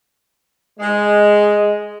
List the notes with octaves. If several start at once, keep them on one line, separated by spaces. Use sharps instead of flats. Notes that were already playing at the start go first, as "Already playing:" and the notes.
G#3